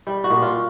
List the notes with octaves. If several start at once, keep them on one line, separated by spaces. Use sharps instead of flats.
G3
F#4
A#2
F4